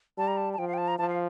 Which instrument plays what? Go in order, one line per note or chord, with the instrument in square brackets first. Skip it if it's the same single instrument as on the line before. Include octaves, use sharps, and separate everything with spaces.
[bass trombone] G3 [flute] A5
[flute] A#5
A5
A5
[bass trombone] F3 [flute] G5
[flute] F5
G5
A5
A#5
[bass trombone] F3 [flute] A5
[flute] F5